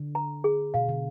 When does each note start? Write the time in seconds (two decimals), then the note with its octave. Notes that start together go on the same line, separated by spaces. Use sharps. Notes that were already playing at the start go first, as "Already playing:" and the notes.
Already playing: D3
0.15 A#5
0.44 G#4
0.74 B2 F5
0.89 D3